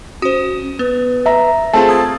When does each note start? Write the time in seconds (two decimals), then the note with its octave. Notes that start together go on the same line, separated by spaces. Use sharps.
0.22 C#4 F#4 C5 D#6
0.79 B3 B4
1.26 E5 A#5
1.73 A3 C4 F4 G#4 A5
1.89 D#6 G#6 A6